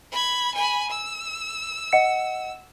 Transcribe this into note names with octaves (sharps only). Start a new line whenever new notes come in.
B5 G#6
G#5 B5
E6
D#5 F#5 C#7